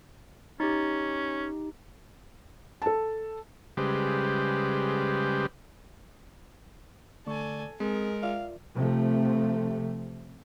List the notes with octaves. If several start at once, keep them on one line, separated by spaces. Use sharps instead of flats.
C#4 D#4 G4
A4 A5
C#3 G3 G#3 G4 B4 C5
D3 A3 A4 D5 G#5 C#6
G#3 C4 G#4 A#4
F4 D5 E5 F5
C3 F3 A3